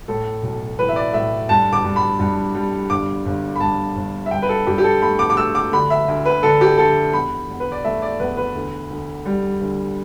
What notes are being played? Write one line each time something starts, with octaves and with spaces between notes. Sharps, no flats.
A2 A4
B1
E3 B4
E5
D5
A2 E5
G2 A5
D6
G2
B5
G2
G3
G1 D6
G1
B5
G2 A5
G1
E5
G2 G5
B4
A4
G2 G4
G4
A4
A3 B5
D6
D6
A3 E6
D6
D3 B5
E5
D2
B4
D3 A4
G4
D3 A4
E2 B5
E2
B4
D5
A3 E5
D5
E2 B4
B4
D2
D2
G3
D2